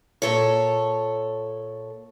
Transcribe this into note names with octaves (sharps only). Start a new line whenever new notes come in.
A#2 A4 C#5